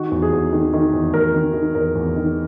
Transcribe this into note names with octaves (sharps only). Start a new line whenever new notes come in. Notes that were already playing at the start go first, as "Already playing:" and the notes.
Already playing: D#3 F#4
E2
G#4
E2
D#3
D#3
E2
E2 A#4
D#3
D#3
E2 A#4
E2
D#3